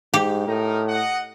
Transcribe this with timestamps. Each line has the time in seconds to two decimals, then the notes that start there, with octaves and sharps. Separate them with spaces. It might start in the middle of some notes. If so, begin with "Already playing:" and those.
0.14 G#2 G4
0.47 A2 D#4 A#4
0.88 D#5 F#5